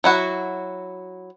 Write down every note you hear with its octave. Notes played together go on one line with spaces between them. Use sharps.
F#3 E4 F#4